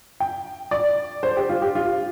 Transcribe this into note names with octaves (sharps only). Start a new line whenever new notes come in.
G5
D5
C5
G4
F4
G4
F4